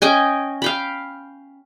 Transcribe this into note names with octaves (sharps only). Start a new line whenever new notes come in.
C#4 D#5 G5 G#5
F5 G5 B5